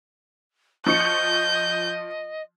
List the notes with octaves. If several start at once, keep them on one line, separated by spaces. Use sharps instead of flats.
F3 D#5 C#6 G6 C#7